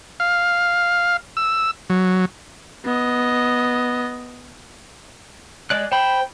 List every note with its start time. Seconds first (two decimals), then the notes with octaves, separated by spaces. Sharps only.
0.20 F5
1.37 E6
1.90 F#3
2.85 B3 D#5
5.70 G#3 D5 F#6
5.92 C5 G5 B5